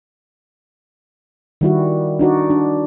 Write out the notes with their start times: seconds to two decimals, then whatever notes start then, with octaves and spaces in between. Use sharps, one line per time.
1.61 D#3 G3 E4 F#4
2.19 D4 D#4 F#4 D5
2.50 D4